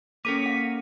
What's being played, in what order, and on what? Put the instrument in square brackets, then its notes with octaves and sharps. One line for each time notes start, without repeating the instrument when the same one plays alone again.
[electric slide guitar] A#3 A#4 C#5 [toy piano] C#4 A4 D6 [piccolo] B6 [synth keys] D#7
[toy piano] F5 F#5